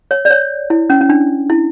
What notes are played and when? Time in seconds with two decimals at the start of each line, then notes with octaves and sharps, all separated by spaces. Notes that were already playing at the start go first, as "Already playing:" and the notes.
0.11 C#5
0.25 D5
0.30 C#5
0.70 E4
0.90 C#4
1.01 C#4
1.09 D4
1.50 E4